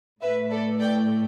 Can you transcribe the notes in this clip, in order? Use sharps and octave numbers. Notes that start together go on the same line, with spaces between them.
A2 A3 B4 E5
A4 D5
D5 G5